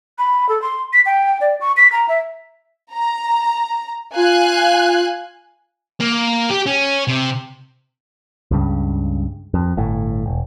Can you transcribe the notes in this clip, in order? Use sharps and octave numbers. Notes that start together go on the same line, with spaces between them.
B5
A4
C6
B6
G5
D5
C#6
B6
A#5
E5
A#5
F4 F5 G#5 F#6
A#3
G4
C#4
C3
C#2 G2 C#3
F2
G1 A2
E1